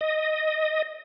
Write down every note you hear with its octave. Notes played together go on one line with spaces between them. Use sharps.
D#5